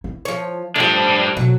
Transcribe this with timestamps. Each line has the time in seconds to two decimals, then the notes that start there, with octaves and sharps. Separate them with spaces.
0.04 E4
0.25 F3 C#5
0.76 A2 F3 G3 D4
1.37 B2 F#3 F4